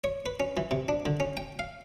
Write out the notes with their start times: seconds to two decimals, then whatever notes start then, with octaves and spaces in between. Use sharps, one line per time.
0.04 C#5
0.26 B4
0.40 C#4
0.57 E3
0.71 C3
0.88 D4
1.06 D3
1.20 C#4
1.37 G5
1.59 F5